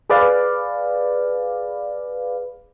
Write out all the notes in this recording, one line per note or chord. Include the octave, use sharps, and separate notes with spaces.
G#4 B4 D5 F5